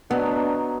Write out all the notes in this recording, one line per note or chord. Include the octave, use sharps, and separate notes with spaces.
F#3 B3 D4 D#4